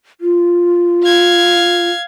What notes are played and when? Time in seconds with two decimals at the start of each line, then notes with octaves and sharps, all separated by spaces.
0.21 F4
1.04 F5 G#6